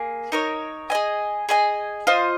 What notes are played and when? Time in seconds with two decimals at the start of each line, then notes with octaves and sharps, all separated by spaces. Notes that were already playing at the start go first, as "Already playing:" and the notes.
Already playing: A#3 G#4
0.32 D#4 A#4 C#5
0.90 G#4 D#5 G#5
1.49 G#4 D#5 G#5
2.07 F4 C5 D#5